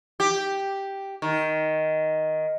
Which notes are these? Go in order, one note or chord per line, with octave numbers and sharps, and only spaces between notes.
G4
D#3